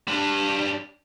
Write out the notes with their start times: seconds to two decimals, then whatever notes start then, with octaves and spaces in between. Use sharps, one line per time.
0.08 G3 D4